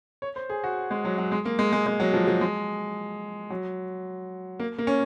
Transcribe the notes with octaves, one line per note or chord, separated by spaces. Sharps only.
C#5
C5
G#4
F#4
G#3
F#3
F#3
G#3
A#3
G#3
G#3
G#3
F#3
F3
F3
G#3
F#3
A#3
A#3
C#4